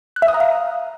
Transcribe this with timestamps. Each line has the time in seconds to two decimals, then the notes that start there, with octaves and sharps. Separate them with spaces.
0.16 F#6
0.22 E5
0.28 D#6
0.34 A#5
0.40 F5